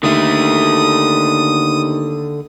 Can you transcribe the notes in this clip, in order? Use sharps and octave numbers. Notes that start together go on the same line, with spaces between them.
D#2 D3 A3 D#6